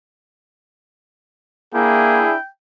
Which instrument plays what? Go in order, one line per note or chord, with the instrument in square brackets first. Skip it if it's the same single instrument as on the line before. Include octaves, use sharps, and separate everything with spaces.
[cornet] A#3 [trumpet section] D4 E4 [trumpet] G#4 [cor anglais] G5